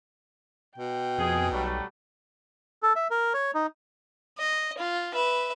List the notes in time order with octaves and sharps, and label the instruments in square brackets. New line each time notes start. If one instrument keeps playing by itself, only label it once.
[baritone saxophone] B2 [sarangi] G5
[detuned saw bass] F2 [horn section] G#4
[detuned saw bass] B1 [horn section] F#3 G3 A3
[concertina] A4
E5
A#4
C#5
D#4
[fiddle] D#5
F4
B4 E5